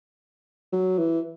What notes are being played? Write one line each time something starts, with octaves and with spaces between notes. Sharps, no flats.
F#3
E3